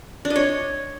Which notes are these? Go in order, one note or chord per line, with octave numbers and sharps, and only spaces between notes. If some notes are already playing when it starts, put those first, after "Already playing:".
D4
D#5
C#5